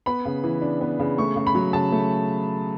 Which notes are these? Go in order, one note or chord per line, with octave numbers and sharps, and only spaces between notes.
B3 B5
C#3
E3
D4
B3
C#3
A3 C#6
C#3
B5
F#3
C#3 A5
A3